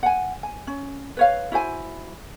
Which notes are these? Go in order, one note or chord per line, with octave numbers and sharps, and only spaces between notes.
F#5 G#5
G#5
C#4
B4 C#5 F5
E4 F#4 C5 G#5